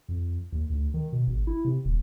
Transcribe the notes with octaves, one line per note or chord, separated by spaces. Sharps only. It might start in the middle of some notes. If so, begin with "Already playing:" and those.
F2
D#2
D2
D#3
B2
G#1
E4
C3
D#1